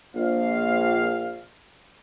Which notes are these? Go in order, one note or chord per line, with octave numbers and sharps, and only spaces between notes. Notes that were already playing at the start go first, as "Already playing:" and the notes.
A#1 F5